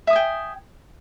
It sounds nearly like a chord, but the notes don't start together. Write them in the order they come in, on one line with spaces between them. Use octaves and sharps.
E5 D#6 G#5 G5